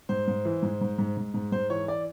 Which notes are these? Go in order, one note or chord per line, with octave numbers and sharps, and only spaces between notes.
G#2 C5
G#2
E3
G#2
G#2
G#2
G#2
G#2
G#2 C5
E3 C#5
D5